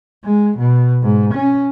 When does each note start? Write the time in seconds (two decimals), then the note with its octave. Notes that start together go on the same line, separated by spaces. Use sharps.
0.24 G#3
0.58 B2
1.03 G#2
1.33 C#4